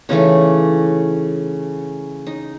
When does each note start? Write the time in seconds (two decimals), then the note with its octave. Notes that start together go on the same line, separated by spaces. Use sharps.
0.09 C#3 E3 A3 D#4
2.27 D#4